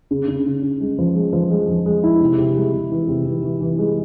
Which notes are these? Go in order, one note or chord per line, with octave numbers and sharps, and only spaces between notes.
C#3
C#3
C#3
C#3
G#3
F3
G#3
F3
G#3
F3
G#3
E4
C3
C3
G#3
C3
E3
C3
E3
E3
E3
G#3